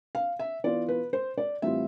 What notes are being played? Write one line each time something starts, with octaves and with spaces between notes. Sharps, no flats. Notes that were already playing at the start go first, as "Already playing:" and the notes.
F5
E5
E3 B3 F4 D5
B4
C5
D5
A2 E3 G3 C4 F4 E5